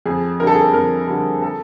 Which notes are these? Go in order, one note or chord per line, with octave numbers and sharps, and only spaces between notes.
F2 G#4
D3 G3 A4 A#4
G#4
A4
F2 A#4
D3 G3 A#4
A4